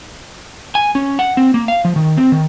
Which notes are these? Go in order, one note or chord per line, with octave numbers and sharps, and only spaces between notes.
G#5
C#4
F#5
C4
A#3
F5
F3
D#3
C4
D#3